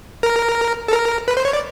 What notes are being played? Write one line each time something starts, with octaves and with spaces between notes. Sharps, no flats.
A#4
A4
A#4
B4
C5
C#5
D5